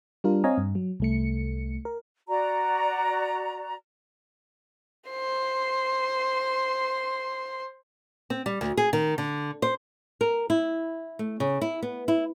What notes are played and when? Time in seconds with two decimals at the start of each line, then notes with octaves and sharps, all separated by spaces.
0.24 G3 D4 F4 A#4
0.44 C4 C#5 D#5 F5 G#5 A#5
0.58 G2
0.75 F#3
1.00 C2 A3 C#7
1.85 A#4
2.28 F#4 D5 A#5
5.10 C5 C6
8.30 C4
8.46 G3
8.61 D2
8.77 G#4
8.93 D#3
9.18 D3
9.62 C5
10.21 A#4
10.50 E4
11.19 A3
11.40 C#3
11.62 E4
11.82 B3
12.08 E4